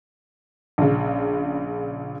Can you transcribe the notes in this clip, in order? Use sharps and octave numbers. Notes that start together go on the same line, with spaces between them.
A#1 C#3